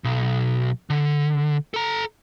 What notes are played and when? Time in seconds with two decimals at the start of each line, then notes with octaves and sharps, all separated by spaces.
0.04 B1
0.90 D3
1.74 A4 A#5